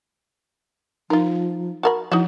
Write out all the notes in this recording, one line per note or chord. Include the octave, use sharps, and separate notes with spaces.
F3 D#4 F4 A#4
F#4 A#4 B5
F3 D#4 E4 F#4